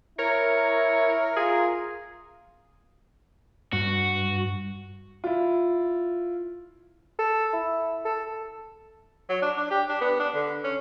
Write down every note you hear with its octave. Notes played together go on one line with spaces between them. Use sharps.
E4 A#4 C#5
F4 G#4
G2 F#4
E4 F4
A4
E4
A4
F#3
D4
D4
G4
D4
B3
D4
D3
C#4